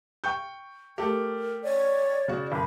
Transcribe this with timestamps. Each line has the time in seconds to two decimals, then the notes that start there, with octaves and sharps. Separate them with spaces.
0.24 G5 C#6 G6
0.98 A3 G4 A#4
1.63 C#5 D5
2.28 C#3 F#4
2.52 F#1 B5